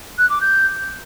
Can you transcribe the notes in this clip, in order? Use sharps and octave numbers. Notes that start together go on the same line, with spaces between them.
F#6
D6
G6